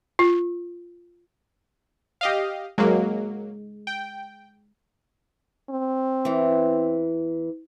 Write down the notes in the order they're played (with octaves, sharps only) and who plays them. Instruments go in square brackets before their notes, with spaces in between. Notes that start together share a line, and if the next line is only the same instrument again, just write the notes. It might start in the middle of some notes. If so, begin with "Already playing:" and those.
[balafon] F4
[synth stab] G4 D#5 F5
[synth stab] F#3 A#3 [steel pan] G#3
[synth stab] G5
[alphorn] C4
[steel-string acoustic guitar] E2 E3